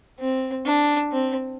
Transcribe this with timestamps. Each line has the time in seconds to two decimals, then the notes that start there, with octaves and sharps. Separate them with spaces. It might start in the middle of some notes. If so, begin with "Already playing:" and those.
0.20 C4
0.66 D4
1.12 C4